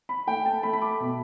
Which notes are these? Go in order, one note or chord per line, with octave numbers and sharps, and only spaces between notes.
B5
A3 G5
A5
A3 B5
B5
D6
B2